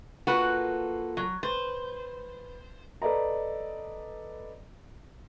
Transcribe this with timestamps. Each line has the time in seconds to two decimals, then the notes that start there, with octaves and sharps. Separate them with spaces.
0.27 A#3 F4 F#4 A4 B4
1.17 F#3
1.43 B4 C5
3.02 A4 B4 D5 D#5 A#5